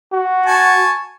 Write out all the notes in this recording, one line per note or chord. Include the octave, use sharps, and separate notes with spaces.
F#4
G#5 A5 C#6